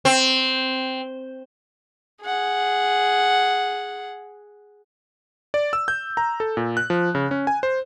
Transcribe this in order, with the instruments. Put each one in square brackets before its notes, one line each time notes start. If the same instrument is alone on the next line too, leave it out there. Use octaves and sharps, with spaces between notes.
[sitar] C4
[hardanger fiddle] G#4 F#5
[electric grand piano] D5
E6
G6
A#5
A4
A#2
F#6
F3
C#3
C#4
G#5
C5